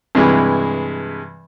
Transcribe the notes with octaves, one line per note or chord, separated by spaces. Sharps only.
G2 C3 E3 G#3